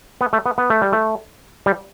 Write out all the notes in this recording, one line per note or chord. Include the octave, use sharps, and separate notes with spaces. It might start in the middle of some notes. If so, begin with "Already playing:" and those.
B3
A3
B3
B3
A3
G3
A3
G3